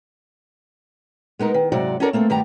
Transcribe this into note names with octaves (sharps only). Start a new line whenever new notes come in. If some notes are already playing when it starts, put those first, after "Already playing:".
G#3 B3 D#4 A#4
D#3
G#2 C3 F#3 F#4 D5
C#4 D#4 F#4 A4 A#4 D5
A3 A#3 C4 A4
G2 D#3 B3 G4 A#5